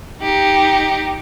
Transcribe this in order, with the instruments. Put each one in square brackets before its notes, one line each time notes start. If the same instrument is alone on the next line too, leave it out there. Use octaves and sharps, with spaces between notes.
[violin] D#4 G4